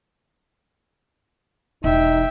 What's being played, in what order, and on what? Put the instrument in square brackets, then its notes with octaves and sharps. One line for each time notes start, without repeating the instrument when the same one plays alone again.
[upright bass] E1 [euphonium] D#4 [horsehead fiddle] E5 G5